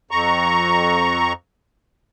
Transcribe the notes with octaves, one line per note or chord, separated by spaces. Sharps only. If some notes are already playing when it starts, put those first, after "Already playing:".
F2 A#5 C#6